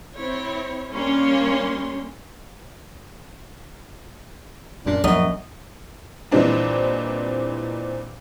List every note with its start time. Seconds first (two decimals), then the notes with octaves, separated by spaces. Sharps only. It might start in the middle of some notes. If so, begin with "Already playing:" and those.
0.15 C4 E4 C#5
0.92 G3 A#3 C#4 D4 C#5 C6
4.86 F#2 A#2 D4
5.04 A#1 F#2 D#5
6.31 A#2 E3 G3 C4 D4 D#4